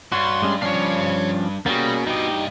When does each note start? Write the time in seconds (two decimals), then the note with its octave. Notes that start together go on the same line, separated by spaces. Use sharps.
0.12 G2 F#4 C#5 C6
0.42 G3 G#3 C#4
0.62 F3 C#4 D4 C#5 F5
1.66 G3 A#3 B3 C#4 F#4 G#4
2.07 G2 D#4 G4 D#5